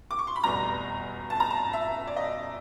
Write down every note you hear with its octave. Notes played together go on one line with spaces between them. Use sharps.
D6
C#6
C6
B5
F1 E2 B2 G3 A#5
A5
A#5
A5
E5
D5
D#5